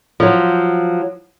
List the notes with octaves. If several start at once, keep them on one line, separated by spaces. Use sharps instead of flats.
F3 F#3